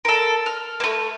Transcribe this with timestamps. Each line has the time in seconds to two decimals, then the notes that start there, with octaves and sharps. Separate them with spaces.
0.05 A4 A#4
0.46 F6
0.80 A3 A#3